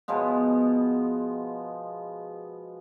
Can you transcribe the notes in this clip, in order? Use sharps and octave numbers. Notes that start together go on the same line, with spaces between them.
B2 F3 G#3 B3